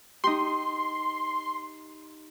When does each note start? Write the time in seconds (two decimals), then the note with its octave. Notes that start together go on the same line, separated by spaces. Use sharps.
0.24 D#4 G4 C6